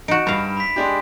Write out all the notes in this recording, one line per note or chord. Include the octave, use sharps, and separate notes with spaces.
D#4 F#4 D7 E7
G2 F5 A#5 B5
B5 B6
G#3 D4 G4